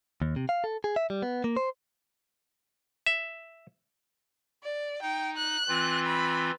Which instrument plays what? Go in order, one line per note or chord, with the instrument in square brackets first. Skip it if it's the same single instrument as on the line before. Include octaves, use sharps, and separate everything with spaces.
[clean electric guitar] D#2
C3
F5
A4
G#4
E5
G3
B3
A#3
C5
[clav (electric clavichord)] E5
[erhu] D5
[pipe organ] D#4 [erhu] G5
[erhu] F#6
[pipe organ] E3 C4 F4
[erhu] B5